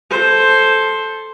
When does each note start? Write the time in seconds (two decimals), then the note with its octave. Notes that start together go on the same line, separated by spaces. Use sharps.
0.10 A4 C5